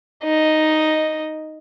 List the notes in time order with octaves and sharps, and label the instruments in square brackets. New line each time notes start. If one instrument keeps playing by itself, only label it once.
[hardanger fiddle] D#4 D#5